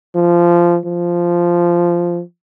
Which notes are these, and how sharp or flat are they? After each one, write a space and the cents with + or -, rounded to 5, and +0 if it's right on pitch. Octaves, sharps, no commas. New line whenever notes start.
F3 -15
F3 -10